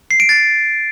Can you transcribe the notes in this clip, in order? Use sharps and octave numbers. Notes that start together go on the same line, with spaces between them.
C7
D7
A6